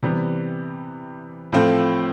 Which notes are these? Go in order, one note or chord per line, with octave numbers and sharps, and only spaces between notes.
C3 E3 G3 B3
A2 F3 A3 C4 F4